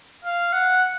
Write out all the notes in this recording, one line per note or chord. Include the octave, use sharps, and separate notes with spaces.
F5
F#5